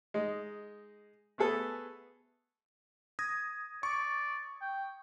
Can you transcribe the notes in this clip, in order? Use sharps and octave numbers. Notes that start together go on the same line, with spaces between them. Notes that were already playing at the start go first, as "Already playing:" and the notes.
G#3 D#4
A3 B3 G#4 A4 B4
D#6 G#6 A#6
D5 C#6
G5